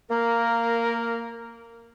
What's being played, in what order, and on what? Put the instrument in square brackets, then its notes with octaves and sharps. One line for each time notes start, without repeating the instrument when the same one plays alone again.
[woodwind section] A#3 A#4